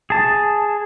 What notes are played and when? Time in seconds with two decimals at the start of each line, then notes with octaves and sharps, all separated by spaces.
0.10 G#4 A5